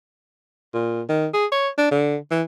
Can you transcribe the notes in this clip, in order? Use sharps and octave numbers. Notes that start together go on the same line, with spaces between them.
A#2
D#3
G#4
C#5
D4
D3
E3